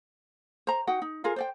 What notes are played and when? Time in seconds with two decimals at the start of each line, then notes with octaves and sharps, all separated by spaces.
0.67 C5 A#5
0.87 D#4 F#4 F#5 G5
1.02 D#4
1.24 F4 G#4 A#4 F5
1.36 C5 D5 G5